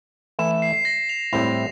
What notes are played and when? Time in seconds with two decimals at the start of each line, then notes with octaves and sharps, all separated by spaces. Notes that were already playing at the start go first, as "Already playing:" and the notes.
0.39 E3 A3 E4 E7
0.51 E7
0.62 C7
0.74 C7
0.85 A#6
1.09 F7
1.32 A2 G3 C4 E4 F7